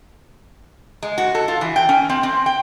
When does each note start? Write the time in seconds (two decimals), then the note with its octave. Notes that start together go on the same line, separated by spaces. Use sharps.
1.03 G#3
1.18 F#4
1.35 A4
1.48 F4
1.61 E3
1.76 G5
1.89 C#4
2.09 C4
2.23 C4
2.46 G5